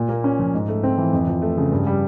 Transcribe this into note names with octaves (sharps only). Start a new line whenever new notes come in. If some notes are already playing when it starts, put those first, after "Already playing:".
Already playing: A#2
A#3
C#4
F3
G#2
A3
C4
E3
F2
F3
A3
C#3
G2
G3